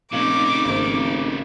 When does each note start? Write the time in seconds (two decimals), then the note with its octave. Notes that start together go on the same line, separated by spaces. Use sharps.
0.12 F1 A#2 C#3 D#4 F5 D6 F#7
0.65 G#1 A#3 C5